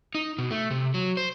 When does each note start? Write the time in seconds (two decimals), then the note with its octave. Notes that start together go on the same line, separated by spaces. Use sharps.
0.15 D#4
0.38 B2
0.51 A3
0.70 C3
0.94 F#3
1.17 C5